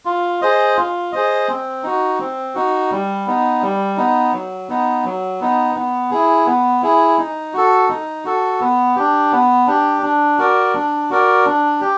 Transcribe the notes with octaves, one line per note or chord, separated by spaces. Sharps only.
F4
G#4 C5 D#5
F4
G#4 C5 D#5
C4
D#4 F#4
C4
D#4 F#4
G3
B3 D#4
G3
B3 D#4
F#3
B3 D#4
F#3
B3 D#4
B3
E4 G#4
B3
E4 G#4
D#4
F#4 A4
D#4
F#4 A4
B3
D4 G4
B3
D4 G4
D4
F#4 A#4 D5
D4
F#4 A#4 D5
D4
G4